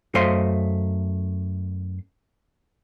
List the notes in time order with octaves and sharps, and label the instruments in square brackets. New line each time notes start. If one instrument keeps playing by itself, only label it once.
[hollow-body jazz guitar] F#2 A3 C5 D#5 F5 C6